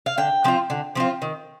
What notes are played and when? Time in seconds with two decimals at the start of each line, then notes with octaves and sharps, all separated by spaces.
0.06 F5
0.18 D3 G5
0.44 F3 C4 F4
0.70 D3
0.95 F3 C4 F4
1.22 D#3